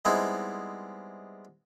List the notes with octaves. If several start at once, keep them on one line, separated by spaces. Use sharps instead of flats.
G3 G#3 B3 C4 D#4 E4